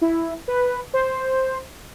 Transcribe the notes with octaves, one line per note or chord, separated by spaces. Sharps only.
E4
B4
C5